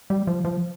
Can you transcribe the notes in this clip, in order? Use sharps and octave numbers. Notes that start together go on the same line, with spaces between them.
G3
F3
F3